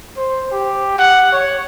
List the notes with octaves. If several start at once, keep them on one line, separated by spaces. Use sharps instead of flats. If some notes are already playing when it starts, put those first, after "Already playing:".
C5
G4
F#5
C#5